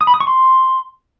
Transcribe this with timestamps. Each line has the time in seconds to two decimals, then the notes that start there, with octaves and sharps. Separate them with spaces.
0.01 D#6
0.07 B5
0.14 D#6
0.20 C#6
0.27 C6